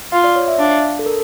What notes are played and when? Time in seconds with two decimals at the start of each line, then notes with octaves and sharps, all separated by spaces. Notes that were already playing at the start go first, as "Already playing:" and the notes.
0.12 F4 F5
0.24 D5
0.36 C#5
0.48 E5
0.59 D4 F5
0.99 A4
1.06 A#4